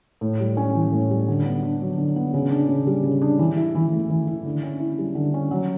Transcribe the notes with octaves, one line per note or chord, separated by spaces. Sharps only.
A2
G3
C#4
E3
A2
G3
D3
B3
D4
F#3
D3
B3
C#3
D4
C#3
G3
C#3
D4
E3
E4
E3
A3
E3
E4
D3
C#4
E4
G3
D3
C#4
F#3